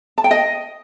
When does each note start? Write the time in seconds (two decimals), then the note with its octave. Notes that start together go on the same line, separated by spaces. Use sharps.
0.18 A5
0.24 G5
0.31 D#5